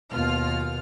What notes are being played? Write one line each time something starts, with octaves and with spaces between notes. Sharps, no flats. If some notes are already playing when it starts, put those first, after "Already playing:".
D#2 B2 F4 F6